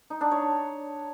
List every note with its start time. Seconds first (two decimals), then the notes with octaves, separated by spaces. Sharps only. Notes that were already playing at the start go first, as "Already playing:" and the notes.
0.10 D#4
0.21 D4
0.31 C#5